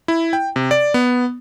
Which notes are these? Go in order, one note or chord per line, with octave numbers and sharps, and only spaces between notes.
E4
G5
C3
D5
B3